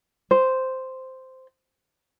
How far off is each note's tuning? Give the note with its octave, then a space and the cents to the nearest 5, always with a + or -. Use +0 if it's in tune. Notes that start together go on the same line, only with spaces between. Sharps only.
C5 -5